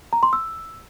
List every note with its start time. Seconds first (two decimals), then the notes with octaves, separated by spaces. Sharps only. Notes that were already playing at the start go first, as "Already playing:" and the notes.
0.13 A#5
0.23 C6
0.33 E6